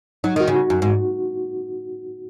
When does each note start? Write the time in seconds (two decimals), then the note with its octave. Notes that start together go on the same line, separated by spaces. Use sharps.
0.24 F#3 D#4
0.36 D#3 F#4
0.48 C#3
0.55 F#4
0.70 F#2
0.82 G#2